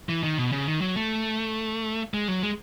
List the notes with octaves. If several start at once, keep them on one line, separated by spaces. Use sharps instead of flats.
E3
D#3
B2
C#3
D#3
F#3
A3
G#3
F#3
G#3